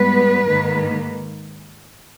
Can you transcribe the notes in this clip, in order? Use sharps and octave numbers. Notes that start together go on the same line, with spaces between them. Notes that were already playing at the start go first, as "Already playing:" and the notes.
Already playing: G#2 G3 B3 B4
G#2 D#3 A#3